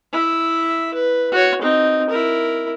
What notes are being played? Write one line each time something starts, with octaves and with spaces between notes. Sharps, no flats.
E4 E5
B4
F#4 C#5
C4 D#4
E4 A#4